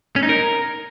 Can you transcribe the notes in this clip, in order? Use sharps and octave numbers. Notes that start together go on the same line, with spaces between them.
C#4
D#4
A#4